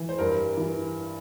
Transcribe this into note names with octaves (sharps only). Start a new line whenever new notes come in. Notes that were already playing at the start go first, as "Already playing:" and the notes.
Already playing: E3
C5
G2 A#4
E3